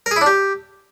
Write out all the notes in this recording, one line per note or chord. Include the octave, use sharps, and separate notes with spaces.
A#4
G#4
E4
D4
G4